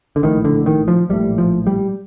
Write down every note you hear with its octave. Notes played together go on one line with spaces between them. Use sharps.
D3
A#1 A2 D#3
D3
D#3
F3
A#1 A2 G3
F3
G3